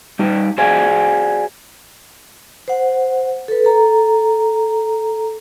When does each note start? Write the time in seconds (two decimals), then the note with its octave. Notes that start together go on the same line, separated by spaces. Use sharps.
0.19 G3 D#4 G4
0.58 F#4 G#4 C5 D5 F5 G#5
2.68 C5 F#5
3.48 A4 B4
3.65 A4 A#5